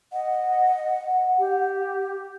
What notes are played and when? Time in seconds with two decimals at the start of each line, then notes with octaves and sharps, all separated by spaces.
0.13 D#5 F#5
1.39 G4